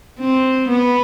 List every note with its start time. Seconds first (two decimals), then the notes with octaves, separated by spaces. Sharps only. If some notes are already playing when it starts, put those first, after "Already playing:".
0.19 C4
0.68 B3